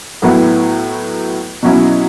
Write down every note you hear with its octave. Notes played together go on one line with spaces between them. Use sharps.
A2 F#3 B3 E4
B2 F#3 C#4 E4